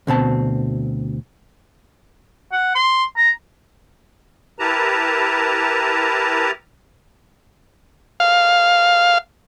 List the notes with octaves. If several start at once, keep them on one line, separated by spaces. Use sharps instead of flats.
D2 B2 C4 A5
F#5
C6
A#5
E4 G4 A#4 B4 A5 A#5
F5